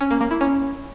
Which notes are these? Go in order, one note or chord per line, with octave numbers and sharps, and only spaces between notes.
C#4
A#3
A#3
E4
C#4